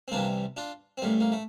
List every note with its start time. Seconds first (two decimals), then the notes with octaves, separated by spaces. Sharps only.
0.08 C4
0.12 C2 C3 E3 G3 A#3 D4
0.57 D4 F4
0.98 C4
1.02 A1 A2 G3 A#3
1.20 A#3
1.32 A3